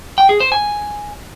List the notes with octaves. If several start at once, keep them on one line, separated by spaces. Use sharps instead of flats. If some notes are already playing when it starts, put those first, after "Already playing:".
G5
G#4
C5
G#5